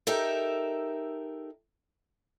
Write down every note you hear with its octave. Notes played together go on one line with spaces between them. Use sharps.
D#4 G4 A4 A#4 E5